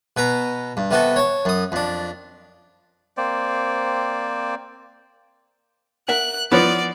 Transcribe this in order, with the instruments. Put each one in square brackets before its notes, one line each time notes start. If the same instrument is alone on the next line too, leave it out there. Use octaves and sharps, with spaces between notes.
[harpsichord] B2 B4 A#5
G2
C3 B3 F#4 A4
C#5 A5
F#2 D#6
F2 D4
[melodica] A#3 C4 C5 D5
[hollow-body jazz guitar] A#4 E5 F#5 [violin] F#6
[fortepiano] F3 B3 [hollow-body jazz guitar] E4 B4 C#5 [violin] D5